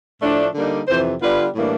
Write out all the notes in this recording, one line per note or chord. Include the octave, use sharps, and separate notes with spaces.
A2 F3 A3 D4
D3 G3 A#3 D#4
F2 C3 E3 C5
D3 G3 B3 D4 F4 B4
A2 E3 G3 A#3 D4